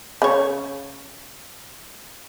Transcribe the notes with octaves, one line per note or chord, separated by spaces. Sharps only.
C#3 C#5